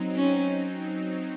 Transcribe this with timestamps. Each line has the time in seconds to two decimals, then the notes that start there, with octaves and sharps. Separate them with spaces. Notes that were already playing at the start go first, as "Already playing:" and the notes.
Already playing: F#3 C4 D#4
0.15 C#4